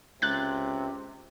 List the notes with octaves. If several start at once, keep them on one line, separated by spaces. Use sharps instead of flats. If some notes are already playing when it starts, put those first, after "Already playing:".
C#2 C3 F#6 A6